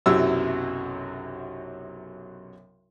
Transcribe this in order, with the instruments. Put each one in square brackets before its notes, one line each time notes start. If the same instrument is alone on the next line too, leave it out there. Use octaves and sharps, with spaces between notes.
[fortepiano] B1 F#2 C3 F#3 E4 E6